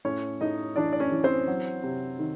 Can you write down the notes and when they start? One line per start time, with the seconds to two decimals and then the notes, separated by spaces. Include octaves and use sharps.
0.05 A2 C#4 C#5
0.41 A2 D#4 D#5
0.76 E3 D4 D5
0.93 D5
1.00 C#4 C#5
1.12 E3
1.24 C4 C5
1.47 F#3
1.83 C3
2.19 D#3